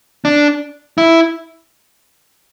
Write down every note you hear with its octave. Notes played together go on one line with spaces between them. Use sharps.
D4
E4